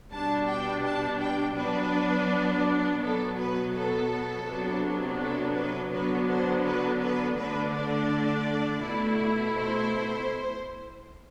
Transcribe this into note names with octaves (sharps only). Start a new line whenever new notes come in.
B2 G3 D4 A5
G5
A5
G5
F#3 B3 D4 B4
B2 F#3 B3 A4
B4
A4
C3 F#3 B3 D4
A4
B4
D3 F#3 B3 D4 B4
C5
B4
B4
D3 A3 D4 B4
D5
B2 A3 E4
C5